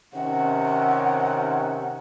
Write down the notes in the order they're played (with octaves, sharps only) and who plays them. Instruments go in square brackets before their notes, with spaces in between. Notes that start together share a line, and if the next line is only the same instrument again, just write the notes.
[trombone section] C3 D#3 C#4 [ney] F#5